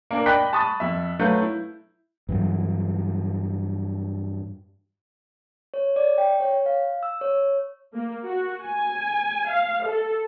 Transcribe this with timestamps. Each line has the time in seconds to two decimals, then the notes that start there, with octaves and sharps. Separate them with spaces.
0.11 A#3 D4 A#4
0.26 D5 D#5 G5 B5 F#6 B6
0.53 A5 B5 C#6 D#6 A6
0.80 F2 E5
1.19 F#3 A3 B4 F5 G6
1.42 E4
2.29 G2 E3 F#3
5.74 C#5
5.96 D5
6.18 G5
6.40 C#5
6.66 F5
7.03 E6
7.21 C#5
7.94 A#3
8.26 F#4
8.65 G#5
9.48 F5
9.84 A4